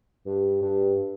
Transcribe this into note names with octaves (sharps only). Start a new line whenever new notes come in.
G2
G2